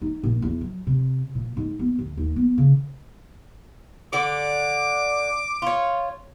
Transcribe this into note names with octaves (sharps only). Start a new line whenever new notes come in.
D#4
A#1
E2
F#3
C3
A#2
G#2
B3
D2
D#2
B3
C#3
D3 D5 D6
F4 C#5